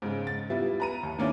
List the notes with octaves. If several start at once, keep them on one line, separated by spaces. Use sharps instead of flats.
G#2 C#3
A6
G3 B3 E4 F4
B4 A#5 D#7
D#2
D#3 A#3 C#4 D4 E4